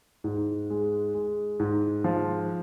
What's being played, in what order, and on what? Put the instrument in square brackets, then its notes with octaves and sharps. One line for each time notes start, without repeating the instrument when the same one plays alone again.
[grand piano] G#2
G#3
G#3
G#2
F3